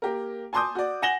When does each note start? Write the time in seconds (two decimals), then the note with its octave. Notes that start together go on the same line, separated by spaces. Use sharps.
0.02 A#3 G4 A#4
0.53 G#5 A5 C6 D6 D#6 G6
0.75 F#4 D5
1.02 F#5 G#5 A#6 E7 F#7 G7